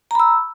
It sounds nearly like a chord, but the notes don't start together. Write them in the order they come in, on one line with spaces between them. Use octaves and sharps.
A#5 B5 E6